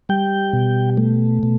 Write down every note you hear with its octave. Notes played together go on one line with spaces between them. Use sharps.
G3 G5
B2
A3
B2